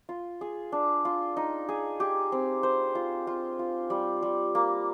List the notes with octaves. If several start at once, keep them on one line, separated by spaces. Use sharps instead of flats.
F4
G#4
D4
F4
D#4
G#4
G4
C4
C5
F4
F4
F4
G3
G3
A#3